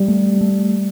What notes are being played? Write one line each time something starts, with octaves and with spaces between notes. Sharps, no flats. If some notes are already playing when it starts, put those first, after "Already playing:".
Already playing: G3
A3
A3